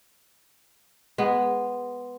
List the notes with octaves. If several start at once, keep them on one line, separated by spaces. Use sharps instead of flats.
G#3 B3